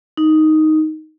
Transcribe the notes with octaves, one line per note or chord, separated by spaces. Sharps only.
D#4